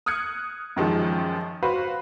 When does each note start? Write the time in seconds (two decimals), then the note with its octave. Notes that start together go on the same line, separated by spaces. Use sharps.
0.06 D#6 F6 F#6 G#6 C#7
0.76 F#2 D#3 F3 G#3
1.63 F#4 B4 C5 F5 B5